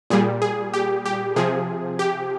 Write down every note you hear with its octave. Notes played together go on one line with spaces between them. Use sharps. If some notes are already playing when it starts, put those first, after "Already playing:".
A#2 G3 G#4
G#4
G4
G4
C3 F3 G#4
G4